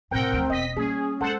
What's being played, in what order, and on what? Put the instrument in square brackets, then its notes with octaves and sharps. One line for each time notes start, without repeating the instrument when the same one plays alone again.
[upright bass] A2 C3 [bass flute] C4 [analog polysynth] A#4 F#5 G5
[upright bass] D2 F3
[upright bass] E1 B3 [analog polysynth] D#5 B6
[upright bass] G3 A#3 [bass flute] C#4 [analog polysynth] G#4
[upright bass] G#3 [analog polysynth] A4 C5 F#5